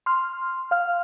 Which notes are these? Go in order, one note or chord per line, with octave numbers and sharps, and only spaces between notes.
C6 F6
F5 F6